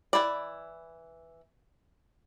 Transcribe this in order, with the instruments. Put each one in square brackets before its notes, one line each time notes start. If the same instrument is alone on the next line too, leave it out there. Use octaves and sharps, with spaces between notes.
[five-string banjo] E3 C4 E4 D5